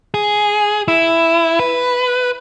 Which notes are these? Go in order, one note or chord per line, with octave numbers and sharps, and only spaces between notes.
G#4
E4
B4